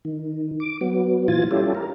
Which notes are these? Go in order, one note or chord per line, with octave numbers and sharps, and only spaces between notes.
D#3
D6
F#3 B3
A#2 E3 F3 F4 G#5 A6
G3 C#4 E4 F4 G4 A4
A#4